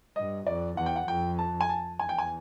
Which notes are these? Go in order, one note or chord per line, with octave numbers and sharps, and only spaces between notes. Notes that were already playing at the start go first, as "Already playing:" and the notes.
G2 D#5
F2 D5
E2 F#5
G5
F#5
F2 G5
A5
G#5
A5
E2 G#5
G5
G#5